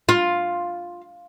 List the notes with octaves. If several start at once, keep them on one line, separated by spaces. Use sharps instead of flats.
F4